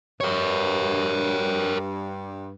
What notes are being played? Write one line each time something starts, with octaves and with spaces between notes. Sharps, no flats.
G2 A#4 C#5